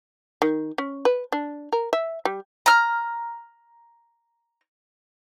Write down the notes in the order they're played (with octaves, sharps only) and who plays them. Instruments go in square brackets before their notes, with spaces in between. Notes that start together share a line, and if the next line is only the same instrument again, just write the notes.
[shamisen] D#3
C#4
B4
D4
A#4
E5
G3
[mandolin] A#5 F6